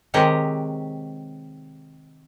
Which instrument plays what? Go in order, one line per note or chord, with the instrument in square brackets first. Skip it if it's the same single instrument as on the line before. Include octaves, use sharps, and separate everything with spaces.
[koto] C3 D#3 G#3 G4 C#5 D#5